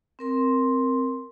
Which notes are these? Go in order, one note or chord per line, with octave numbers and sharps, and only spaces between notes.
C4 A#4 C6